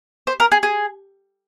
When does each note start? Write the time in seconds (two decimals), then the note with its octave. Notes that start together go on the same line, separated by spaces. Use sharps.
0.27 C5
0.40 A#4
0.52 G#4
0.63 G#4